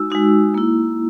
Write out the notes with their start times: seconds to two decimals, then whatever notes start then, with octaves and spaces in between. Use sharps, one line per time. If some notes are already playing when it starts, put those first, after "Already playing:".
Already playing: G#3 D#4 F#4 E6
0.10 G#3 D#4 F#4
0.54 A#3 E4